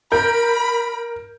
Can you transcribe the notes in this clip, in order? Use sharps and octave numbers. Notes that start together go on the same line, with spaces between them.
A#4 B5 G6